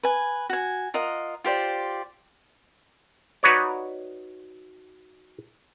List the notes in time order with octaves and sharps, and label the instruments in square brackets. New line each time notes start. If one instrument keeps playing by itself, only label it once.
[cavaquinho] B4 G#5
F#4 G#5
F4 A#4 D#5 F#5
F4 G4 C5 D5
[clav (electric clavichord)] D#4 F#4 B4 C#5 D5